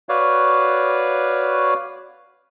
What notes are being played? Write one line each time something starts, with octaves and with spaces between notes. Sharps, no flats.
F#4 B4 C#5 D5 F5